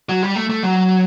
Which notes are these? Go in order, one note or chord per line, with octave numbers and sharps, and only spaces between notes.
F#3
G3
A3
A3
F#3